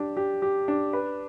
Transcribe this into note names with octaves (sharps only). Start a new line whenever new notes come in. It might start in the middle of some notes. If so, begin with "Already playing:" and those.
Already playing: D4 G4
G4
G4
D4
B4